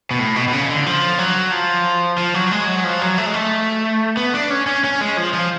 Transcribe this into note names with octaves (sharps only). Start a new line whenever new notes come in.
B2
A2
B2
B2
C#3
D3
F3
F#3
F3
F3
F#3
G#3
F#3
F3
F#3
A3
G#3
A3
B3
D4
C#4
C#4
C#4
G#3
F3
F3